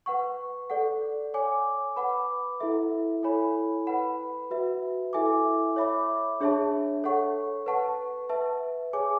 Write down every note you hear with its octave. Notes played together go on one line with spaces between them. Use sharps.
B4 F#5 C#6
A4 D5 F#5
C#5 G#5 D6
B4 F#5 B5 D6
E4 A4 E5
E4 A4 C#5 G#5 B5
B4 F#5 B5
F#4 B4 E5
E4 A4 E5 G#5 D6
C#5 E5 B5 D6
D4 G#4 C#5 E5 A5
A4 C#5 F#5 C#6
B4 F#5 A5 C#6
B4 E5 A5
G#4 C#5 G#5 D6